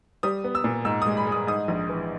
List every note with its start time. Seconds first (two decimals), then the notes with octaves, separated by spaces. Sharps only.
0.23 G3 D#6
0.44 B3
0.55 E6
0.64 A#2
0.85 G#2 E6
1.02 G#3 D#6
1.17 B5
1.27 G#3
1.32 D#6
1.47 G#2 D#6
1.68 A#1
1.89 E3